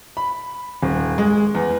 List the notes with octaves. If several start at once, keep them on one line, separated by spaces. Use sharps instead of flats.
B5
D#1
G#3
E2